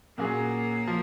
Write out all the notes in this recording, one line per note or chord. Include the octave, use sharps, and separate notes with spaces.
A#2 F#3 A#3 C#4 G#4
F3